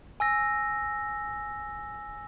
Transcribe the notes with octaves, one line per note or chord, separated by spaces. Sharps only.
G#5 E6 A#6